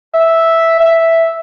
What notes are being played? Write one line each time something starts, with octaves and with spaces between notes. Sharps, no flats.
E5
E5